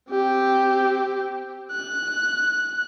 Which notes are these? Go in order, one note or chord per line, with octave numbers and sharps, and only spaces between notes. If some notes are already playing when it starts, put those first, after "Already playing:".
C4 G4
F#6